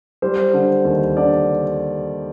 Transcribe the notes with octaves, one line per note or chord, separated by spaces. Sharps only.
G3 C5
D3
D#2
D3 D5